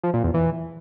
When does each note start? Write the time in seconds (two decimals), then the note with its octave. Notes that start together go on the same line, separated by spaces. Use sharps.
0.03 F3
0.14 A#2
0.24 E2
0.34 E3